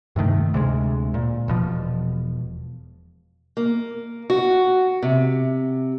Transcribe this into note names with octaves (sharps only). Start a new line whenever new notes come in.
G2 C3 D#3 A3
D2 C3 G#3
A#2
E1 B2 F3
A#3
F#4
C3